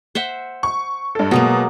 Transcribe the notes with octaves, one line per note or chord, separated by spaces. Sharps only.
C5 E5 F#5
C#6
G2 A4
B2 F#3 G#3 A#3